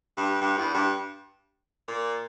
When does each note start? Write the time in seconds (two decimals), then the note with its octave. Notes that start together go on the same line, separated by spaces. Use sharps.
0.17 G2
0.41 G2
0.57 E2
0.74 G2
1.88 A#2